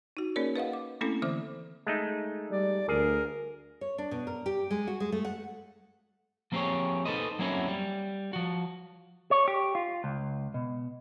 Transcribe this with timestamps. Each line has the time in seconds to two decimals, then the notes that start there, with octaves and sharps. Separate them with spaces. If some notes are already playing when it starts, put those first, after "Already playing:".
0.17 D#4 F#4
0.36 A#3 C#4 G#4 A#4 C#5 D5
0.56 B4 D#5 F5 F#5
0.73 D6
1.01 A3 A#3 C4 C#4 E4 A4
1.22 D3 E3 C5 E5 D6
1.87 G#3 A3 D#4
2.51 G3 D5
2.88 D2 G#4 A#4
3.81 C#5
3.98 D4
4.11 B2
4.27 A#4
4.46 G4
4.71 G#3
4.87 F#4
5.00 G#3
5.12 A3
5.25 F#5
6.52 F3 A#3 C4 G4 G#4 C#5
7.05 D#4 A4 B4 C5 D#5
7.39 F#3 A#3 C4 C#4 E4 F#4
7.68 G3
8.33 F3 F#4
9.31 C#5
9.48 G4
9.75 F4
10.04 C#2
10.54 B2